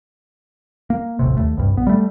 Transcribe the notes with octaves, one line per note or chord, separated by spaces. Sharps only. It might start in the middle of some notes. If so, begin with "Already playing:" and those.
A#3
D#1 A1 C3
D#2 A3
C2 G2
A#1 B3
G3 A3